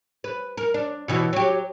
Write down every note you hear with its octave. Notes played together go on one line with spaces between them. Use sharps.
B4
A#4
D4
B2 E3 F#4
F#3 G4